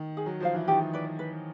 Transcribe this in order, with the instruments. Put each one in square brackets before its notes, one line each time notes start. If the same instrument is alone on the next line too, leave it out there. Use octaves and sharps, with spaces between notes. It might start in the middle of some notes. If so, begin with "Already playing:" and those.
Already playing: [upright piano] D#3
[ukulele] G#4
[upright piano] F#3
[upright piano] F3 [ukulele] C5 F5
[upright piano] E3
[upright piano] D#3 [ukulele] G4
[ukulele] B4 D5
B4